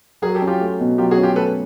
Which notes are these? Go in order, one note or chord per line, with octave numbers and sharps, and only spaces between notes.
F#3 G#4 A#4
G4 A4
C#4
F4 G4
A3
B2
F#3 F4 G4
F#4 G#4
C#4
F4 G4
A3 A4 B4